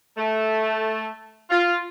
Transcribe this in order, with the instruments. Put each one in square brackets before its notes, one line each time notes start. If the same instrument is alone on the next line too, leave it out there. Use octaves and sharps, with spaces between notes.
[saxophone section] A3
F4